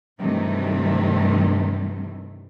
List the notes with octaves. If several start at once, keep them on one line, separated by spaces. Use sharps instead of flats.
G2 C3 D#3 E3 F#3 A3